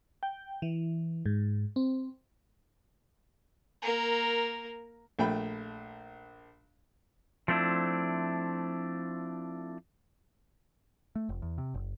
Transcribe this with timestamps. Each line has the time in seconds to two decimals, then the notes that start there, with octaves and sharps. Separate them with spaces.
0.23 G5
0.62 E3
1.26 G#2
1.76 C4
3.82 A#3 A#4
5.19 A#1 A3 G5 B5
7.48 F3 A3 C4 D4 E4
11.16 A3
11.29 F1
11.42 E2
11.58 C3
11.74 F#1